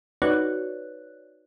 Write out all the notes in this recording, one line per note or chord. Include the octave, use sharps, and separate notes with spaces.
D#4 F#4 B4 C#5 D5 F#6